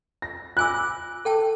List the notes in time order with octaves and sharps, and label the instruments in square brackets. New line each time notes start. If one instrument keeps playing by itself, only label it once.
[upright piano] A#6
[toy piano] F4 G#5 E6 [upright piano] D6 F#6
[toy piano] A4 G5 A5